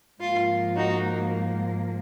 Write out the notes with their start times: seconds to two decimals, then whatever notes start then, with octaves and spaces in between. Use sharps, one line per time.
0.21 G#2 F3 A#3 F4
0.75 D#4 F#4